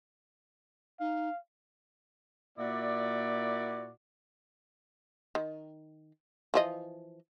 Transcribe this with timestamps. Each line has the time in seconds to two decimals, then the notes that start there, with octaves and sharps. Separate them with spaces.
1.00 D#4 F5
2.58 A#2 A#3 E4 F#4 D5
5.35 D#3
6.54 E3 F3 D#5